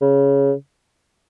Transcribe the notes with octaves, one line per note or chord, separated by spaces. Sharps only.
C#3